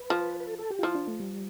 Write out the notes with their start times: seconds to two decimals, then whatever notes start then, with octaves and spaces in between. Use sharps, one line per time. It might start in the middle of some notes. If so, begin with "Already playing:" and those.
Already playing: B4
0.10 F3
0.40 B4
0.47 A4
0.59 A4
0.70 G4
0.79 F4
0.83 F3 E4
0.95 D4
1.07 A3
1.19 G3